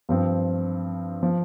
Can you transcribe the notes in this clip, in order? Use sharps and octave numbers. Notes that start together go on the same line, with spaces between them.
G2 F3 C4
F3